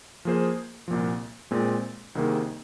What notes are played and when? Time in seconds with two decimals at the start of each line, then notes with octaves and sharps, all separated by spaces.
0.25 F3 A#3 G#4 C5
0.88 C2 A#2 F3
1.51 A#2 G#3 C4
2.15 C2 C3 D#3 A#3 G#4